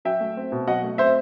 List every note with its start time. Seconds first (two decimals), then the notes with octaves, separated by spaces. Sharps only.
0.05 F#3 E5 G5
0.21 A3
0.37 C4
0.52 B2
0.67 F#3 D#5 F#5
0.84 A3
0.98 C4 C5 E5